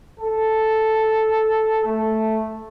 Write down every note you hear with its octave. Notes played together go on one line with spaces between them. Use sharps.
A4
A3